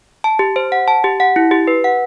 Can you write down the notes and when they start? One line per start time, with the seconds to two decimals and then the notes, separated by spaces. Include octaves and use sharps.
0.24 A5
0.39 G4
0.56 C5
0.72 F#5
0.88 A5
1.04 G4
1.20 F#5
1.36 E4
1.51 G4
1.67 B4
1.84 F#5